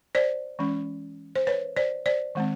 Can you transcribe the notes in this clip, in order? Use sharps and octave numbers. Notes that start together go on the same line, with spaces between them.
C5 D5
E3 G#3 C#4
C5
B4 C#5
C5 D5
C5 D5
D#3 G#3 C4